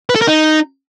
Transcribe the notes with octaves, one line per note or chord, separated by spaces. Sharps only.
B4
A4
A#4
D#4